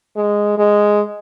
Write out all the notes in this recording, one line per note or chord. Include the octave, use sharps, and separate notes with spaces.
G#3
G#3